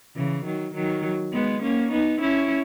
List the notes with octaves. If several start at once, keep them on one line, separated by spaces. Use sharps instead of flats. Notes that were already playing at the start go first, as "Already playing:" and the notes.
C#3 E3
D#3 F#3
D#3 F#3
G#3 B3
A#3 C#4
B3 D#4
C#4 E4